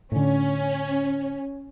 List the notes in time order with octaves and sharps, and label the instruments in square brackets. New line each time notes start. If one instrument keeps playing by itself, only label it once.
[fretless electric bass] A2 D3 [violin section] C#4